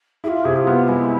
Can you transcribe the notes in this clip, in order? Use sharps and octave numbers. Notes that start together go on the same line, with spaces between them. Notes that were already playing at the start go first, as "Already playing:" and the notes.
E4 F4 G#4
C3 G#4
F4
B3
G#3 E4